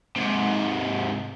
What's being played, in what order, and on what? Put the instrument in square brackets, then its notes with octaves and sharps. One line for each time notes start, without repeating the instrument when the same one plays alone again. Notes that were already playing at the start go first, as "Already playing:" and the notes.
[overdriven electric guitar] G#2 C3